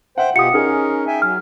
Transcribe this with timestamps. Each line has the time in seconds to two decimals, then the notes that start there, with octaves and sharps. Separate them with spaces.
0.18 C5 E5 F#5 G5
0.36 B2 F4 G4 F#5 D#6 C#7
0.54 C#4 D#4 G#4 A#4
1.07 E5 G5 G#5
1.22 F#3 F6